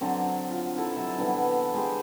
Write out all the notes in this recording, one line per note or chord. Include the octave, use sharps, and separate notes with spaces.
D3 F#3 C4
F4
D#4 E4 A4
C3 F#3 C4 F#4
D3 E3 G3 B3
G#3 F#4 G4 C5